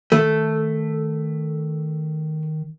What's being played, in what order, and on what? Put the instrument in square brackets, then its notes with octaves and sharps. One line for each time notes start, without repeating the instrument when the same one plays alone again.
[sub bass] D#3 [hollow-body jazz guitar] A3